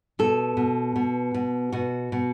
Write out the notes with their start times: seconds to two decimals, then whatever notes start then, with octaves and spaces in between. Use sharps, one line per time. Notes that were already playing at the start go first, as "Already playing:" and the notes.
0.19 B2 A4
0.57 B2
0.96 B2
1.34 B2
1.72 B2 F#4
2.12 B2